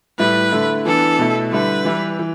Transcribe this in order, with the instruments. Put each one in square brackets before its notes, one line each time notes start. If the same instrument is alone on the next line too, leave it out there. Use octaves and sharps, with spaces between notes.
[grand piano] A2 G3 E4 [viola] B4
[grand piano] D3 A3 E4
[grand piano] E3 B3 D4 [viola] A4
[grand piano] B2 A3 E4
[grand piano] D3 G3 E4 [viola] B4
[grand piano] E3 G3 E4
E3